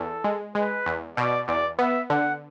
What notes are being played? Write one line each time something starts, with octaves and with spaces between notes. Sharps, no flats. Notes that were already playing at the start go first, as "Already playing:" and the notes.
Already playing: E2 A4
G#3
G#3 B4
E2
B2 D5
E2 D5
B3 E5
D3 F#5